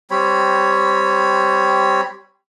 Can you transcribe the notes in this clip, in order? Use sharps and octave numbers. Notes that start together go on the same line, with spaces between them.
G3 C4 C#5 B5